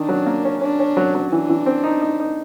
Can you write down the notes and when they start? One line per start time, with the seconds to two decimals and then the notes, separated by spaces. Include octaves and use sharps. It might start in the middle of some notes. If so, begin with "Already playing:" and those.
Already playing: D#3 D4
0.09 F#3
0.26 A#3
0.45 C#4
0.61 C#4 D4
0.79 C#4
0.97 F#3
1.15 F#3
1.32 E3 D4
1.50 E3
1.66 C4
1.84 D#4
2.02 D#4
2.20 D#4